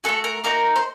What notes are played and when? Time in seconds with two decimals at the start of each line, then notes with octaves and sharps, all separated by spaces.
0.04 A3 C4 F#4 A4
0.24 A#4
0.44 A#3 D#4 F#4 A#4
0.76 C5